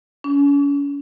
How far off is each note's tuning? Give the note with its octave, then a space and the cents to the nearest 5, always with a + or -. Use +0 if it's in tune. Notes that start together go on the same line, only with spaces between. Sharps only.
C#4 +35